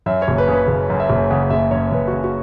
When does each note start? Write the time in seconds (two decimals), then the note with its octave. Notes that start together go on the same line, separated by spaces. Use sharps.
0.06 F#2 E5
0.22 C#5
0.28 F#1
0.38 B4
0.48 C#3
0.53 B4
0.68 F#1
0.90 F#2
1.00 E5
1.10 F#1
1.31 C#3 F#5
1.50 F#1 E5
1.71 F#2 C#5
1.92 F#1 B4
2.08 C#3 F#4
2.24 F#4